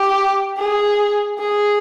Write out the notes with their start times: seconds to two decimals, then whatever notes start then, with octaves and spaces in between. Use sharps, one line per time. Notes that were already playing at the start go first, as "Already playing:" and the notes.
Already playing: G4
0.57 G#4
1.39 G#4